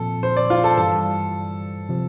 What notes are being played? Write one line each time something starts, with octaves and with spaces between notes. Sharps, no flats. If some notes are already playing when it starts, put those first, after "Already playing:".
Already playing: A#2 F3 C4 A4
C5
D5
F4
A4
G2 E3 G3 A4
C3 F3